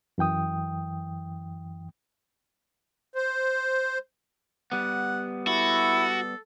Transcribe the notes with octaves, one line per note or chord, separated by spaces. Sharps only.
F#2 E3 G5 D#6
C5
G3 B3 F#5
E4 F#4 A4